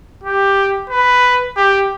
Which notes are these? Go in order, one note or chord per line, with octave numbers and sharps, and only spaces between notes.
G4
B4
G4